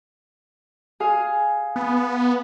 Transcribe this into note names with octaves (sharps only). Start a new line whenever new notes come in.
G#4 F5
B3